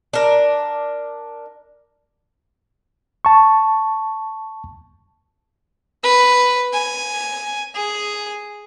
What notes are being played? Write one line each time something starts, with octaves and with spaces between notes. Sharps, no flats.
D4 A#4
A5 C#6
B4
G#5
G#4